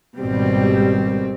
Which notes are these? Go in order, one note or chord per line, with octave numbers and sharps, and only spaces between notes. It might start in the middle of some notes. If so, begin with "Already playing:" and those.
G#1 B2 G3 C4